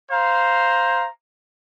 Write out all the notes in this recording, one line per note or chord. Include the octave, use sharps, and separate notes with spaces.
C5 F5 A#5